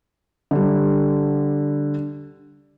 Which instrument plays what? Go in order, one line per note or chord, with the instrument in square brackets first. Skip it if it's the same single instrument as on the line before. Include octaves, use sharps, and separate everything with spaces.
[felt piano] D3 G3